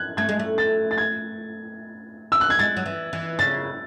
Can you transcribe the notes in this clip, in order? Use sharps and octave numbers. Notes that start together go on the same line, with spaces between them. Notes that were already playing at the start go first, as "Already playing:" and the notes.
Already playing: F#6 G#6
A3 G#6
G#3
A3
A6
A6
G#6
E6
F#6
G#6
G#3 A6
F#3
E3
E3
C#3 A6